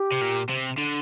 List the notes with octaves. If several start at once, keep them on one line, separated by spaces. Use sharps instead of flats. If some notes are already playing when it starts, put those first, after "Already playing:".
Already playing: G4
C3
A#2
C3
D3